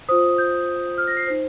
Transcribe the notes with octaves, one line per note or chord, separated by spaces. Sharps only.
F4 C5 D#6
G6
F6
A#6
C7
D#4 C5